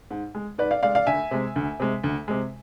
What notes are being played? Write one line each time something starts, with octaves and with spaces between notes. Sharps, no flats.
G#2
G#3
G#2 B4 D5
D5 F5
G#3 D5 F5
D5 F5
D2 E5 G#5
C3 G#3
D2
C3 G#3
D2
C3 G#3